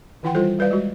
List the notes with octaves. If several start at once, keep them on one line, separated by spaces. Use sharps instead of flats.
D#3 E3 E4 F#5 G5 C6
G3 F4 A4 C5
G3 B4 D5 F5
G#3 F#4